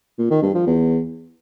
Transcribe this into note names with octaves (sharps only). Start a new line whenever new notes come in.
A#2
D#3
G2
F3
E2